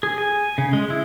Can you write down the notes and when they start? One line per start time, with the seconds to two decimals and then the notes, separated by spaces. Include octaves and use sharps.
0.03 G#4
0.18 G#5
0.58 C#3
0.73 G#3
0.90 E4